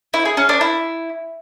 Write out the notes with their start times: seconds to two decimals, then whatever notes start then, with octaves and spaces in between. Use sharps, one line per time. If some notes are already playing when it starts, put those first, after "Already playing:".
0.14 E4
0.25 G#4
0.37 C#4
0.49 D4
0.61 E4